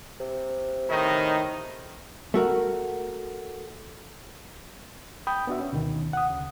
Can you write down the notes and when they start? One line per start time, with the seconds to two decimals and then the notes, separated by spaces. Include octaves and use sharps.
0.20 C3
0.89 A2 D#3 D#4
2.34 A3 F#4 A#4
5.27 G5 B5 D#6 G6
5.47 B3 D4 F#4 E5
5.60 C#4
5.73 D2 B2 D#3
6.13 F#5 D#6
6.30 D2 C#3